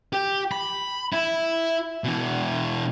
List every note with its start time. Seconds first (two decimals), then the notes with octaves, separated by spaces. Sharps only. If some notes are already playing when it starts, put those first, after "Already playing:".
0.13 G4
0.52 B5
1.13 E4
2.04 B2 E3